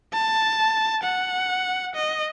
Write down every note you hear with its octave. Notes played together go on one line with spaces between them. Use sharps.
A5
F#5
D#5